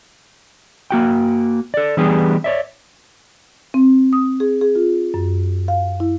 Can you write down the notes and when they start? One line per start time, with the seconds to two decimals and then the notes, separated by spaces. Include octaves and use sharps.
0.91 A#3 F#4 G5
1.74 A4 D5
1.97 E3 G3 B3 D4 G4 G#4
2.44 C#5 D5 E5
3.74 C4
4.13 D#6
4.40 G#4
4.61 G#4
4.75 F4
5.14 F#2
5.68 F5
6.00 E4